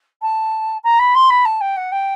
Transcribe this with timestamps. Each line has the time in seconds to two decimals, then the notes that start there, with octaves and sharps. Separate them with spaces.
0.22 A5
0.84 A#5
0.99 B5
1.15 C6
1.30 B5
1.45 A5
1.61 G5
1.77 F#5
1.92 G5